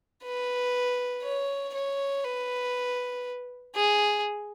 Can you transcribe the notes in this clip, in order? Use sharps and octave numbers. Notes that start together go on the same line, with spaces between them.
B4
C#5
C#5
B4
G#4